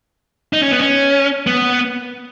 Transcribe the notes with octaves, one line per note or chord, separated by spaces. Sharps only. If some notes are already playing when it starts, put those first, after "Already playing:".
D#4
C#4
B3
C#4
B3